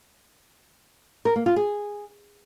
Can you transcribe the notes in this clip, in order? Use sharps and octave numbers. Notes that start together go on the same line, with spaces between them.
A#4
A#3
F4
G#4